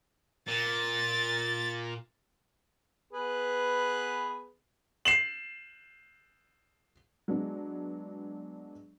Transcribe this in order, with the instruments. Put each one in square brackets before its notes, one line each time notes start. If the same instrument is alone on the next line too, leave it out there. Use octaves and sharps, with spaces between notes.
[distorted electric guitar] A#2 [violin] A6
[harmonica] B3 G#4 B4
[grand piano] C7 E7 F#7
[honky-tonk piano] F#3 G#3 B3 D4